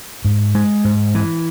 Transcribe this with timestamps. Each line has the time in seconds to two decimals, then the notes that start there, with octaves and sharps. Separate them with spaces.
0.25 G#2
0.55 G#3
0.84 G#2
1.15 E3